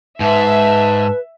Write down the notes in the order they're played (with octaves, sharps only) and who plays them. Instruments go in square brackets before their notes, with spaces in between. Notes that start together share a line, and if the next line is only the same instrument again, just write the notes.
[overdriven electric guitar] G#2 [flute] B4 [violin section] E5 [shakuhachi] A5